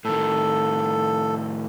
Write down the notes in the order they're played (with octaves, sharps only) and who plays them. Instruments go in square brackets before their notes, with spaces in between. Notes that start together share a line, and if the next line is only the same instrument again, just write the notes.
[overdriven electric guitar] A2 D#3 [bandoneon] A4